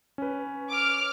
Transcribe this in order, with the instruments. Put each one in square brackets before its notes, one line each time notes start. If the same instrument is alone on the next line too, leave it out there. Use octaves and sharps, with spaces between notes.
[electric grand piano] C#4 B4
[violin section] D6 F6